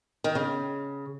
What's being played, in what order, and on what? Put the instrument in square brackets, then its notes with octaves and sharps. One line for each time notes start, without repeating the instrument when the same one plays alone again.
[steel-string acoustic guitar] D#3
C#3